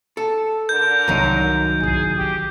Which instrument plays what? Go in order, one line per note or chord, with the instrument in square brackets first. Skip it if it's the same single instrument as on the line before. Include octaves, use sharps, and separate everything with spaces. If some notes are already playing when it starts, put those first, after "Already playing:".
[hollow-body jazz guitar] A4
[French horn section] D3 A#4 [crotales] G6
[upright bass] C2 E3 [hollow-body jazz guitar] D#3 F#3 D#4
[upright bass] B1 E4 [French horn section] G#4
[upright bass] C4 [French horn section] G4